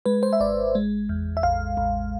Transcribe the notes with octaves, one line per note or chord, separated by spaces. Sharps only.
G#3 B4
C5
E5
G#1 D5
G#3
E2
E5
A1 F5
A1